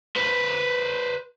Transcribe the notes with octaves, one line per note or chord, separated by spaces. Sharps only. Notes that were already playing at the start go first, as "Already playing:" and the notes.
B4 C5